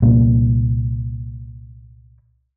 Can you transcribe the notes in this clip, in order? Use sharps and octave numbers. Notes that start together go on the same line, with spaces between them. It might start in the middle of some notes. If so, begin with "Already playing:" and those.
C2 A#2 A#3